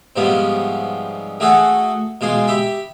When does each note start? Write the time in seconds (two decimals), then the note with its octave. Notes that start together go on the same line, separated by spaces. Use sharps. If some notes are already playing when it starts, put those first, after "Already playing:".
0.16 G#2 C3 F3 G3 B3 C#4
1.40 A3 F#4 G#4 A4 F#5
2.21 B2 G#3 F4 G#4
2.47 G4 E5 B5